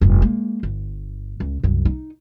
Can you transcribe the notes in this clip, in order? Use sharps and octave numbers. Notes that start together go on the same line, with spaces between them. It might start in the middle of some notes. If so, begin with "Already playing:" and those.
F1 G2
G#3 A#3
G1
C#2
C2 F#2
D#4